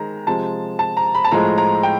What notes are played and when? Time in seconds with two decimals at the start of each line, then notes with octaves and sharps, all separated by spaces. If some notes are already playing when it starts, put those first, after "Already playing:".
Already playing: D#3 G#3 A#5
0.26 C3 F3 G#3 A5
0.79 A5
0.97 A#5
1.15 B5
1.24 A5
1.31 A2 F3 G#3 A#5
1.58 A#5
1.83 G5